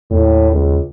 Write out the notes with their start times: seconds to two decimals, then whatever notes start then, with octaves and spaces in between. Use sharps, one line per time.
0.11 D#2 A2
0.52 C#2